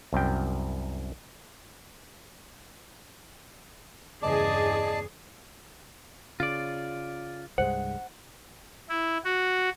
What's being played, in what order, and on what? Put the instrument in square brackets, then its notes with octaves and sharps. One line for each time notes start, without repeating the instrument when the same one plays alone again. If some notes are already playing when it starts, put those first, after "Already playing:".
[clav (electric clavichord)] C2 F#2 G5
[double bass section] E2 G2 C#3 [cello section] G#4 [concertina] D5 A5 D6 [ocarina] D#5
[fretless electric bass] C#3 [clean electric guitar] F4 D5
[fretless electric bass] C2 G2 G#3 [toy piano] C5 [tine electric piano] F#5
[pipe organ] E4
F#4